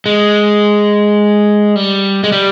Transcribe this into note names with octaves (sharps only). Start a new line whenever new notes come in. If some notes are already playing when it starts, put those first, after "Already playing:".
G#3
G3
G#3
G3